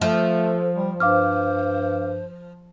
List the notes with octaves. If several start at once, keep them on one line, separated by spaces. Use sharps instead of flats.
F3 A3 A4
G3
G2 C5 F5 D6 F6